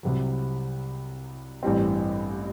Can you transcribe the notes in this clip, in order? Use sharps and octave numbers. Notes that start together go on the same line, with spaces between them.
C2 C3 F#3
A1 G2 E3 G3 C4